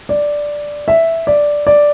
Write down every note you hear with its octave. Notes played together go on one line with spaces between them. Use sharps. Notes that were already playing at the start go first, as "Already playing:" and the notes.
D5
E5
D5
D5